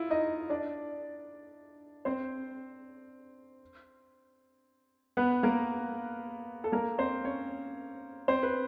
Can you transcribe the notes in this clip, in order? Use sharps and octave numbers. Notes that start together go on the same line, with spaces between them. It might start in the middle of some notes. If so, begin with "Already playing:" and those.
Already playing: E4 F4
D#4 D#5
D4 D5
C4 C5
B3 B4
A#3 A#4
A4
A#3 A#4
C4 C5
C#4 C#5
C4 C5
B4